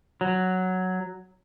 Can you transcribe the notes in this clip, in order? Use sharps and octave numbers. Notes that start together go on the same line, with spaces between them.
F#3